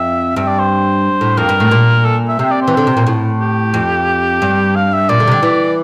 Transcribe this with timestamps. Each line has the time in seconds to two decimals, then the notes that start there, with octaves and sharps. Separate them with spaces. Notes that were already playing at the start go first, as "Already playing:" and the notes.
Already playing: F2 E5
0.36 G2 E5
0.47 D5
0.59 C5
1.21 A2
1.37 F2 A#4
1.49 G2
1.60 A2
1.71 A#2
2.05 A4
2.28 E5
2.39 C3 E5
2.51 D5
2.61 C5
2.68 E3
2.73 D3 C5
2.87 C3
2.97 A#2
3.07 A2
3.41 G4
3.74 F2
4.42 G2
4.76 F5
4.93 E5
5.09 A#2 D5
5.20 D3
5.27 C3
5.31 D3
5.43 E3